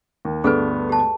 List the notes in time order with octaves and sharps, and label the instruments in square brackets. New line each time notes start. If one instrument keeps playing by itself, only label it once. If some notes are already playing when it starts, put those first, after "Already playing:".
[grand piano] D#2
[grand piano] D2 G2 B3 [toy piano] G#4 A4 B4
[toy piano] G4 A5